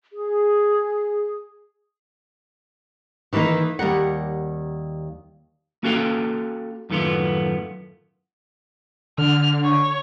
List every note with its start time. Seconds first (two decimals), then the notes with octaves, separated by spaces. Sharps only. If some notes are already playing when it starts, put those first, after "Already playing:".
0.12 G#4
3.33 D#3 E3 A3 A#3 D#4
3.79 D#2 G3 A#4 F#5
5.83 A#3 C#4 F#4 A4 F5 G5
6.90 F#2 A2 D#3 A3 B3 F4
9.18 D3 F6
9.63 C#5